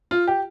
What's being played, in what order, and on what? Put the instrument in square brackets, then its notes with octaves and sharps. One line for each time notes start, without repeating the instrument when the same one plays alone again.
[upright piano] F4
G4